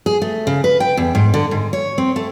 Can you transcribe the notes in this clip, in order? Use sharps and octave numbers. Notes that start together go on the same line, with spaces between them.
G#4
A3
C#3
B4
G5
E2
G#2
D3
G#2
C#5
C4
A3